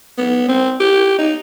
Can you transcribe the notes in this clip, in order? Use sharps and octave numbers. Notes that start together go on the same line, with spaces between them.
B3
C4
G4
D#4